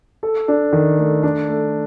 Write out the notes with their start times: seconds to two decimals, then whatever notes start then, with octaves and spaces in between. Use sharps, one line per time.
0.23 A4
0.48 D4
0.73 D#3
0.99 A3
1.23 D4
1.49 A3